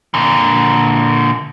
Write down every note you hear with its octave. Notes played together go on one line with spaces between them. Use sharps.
A#2 D3